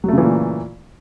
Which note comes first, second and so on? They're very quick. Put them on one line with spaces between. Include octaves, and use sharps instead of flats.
F#3 A3 C#3 E3 A#2